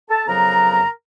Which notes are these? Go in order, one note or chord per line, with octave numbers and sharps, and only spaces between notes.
A4 A5
F2 C#3 F#3 B3 A#4 A#5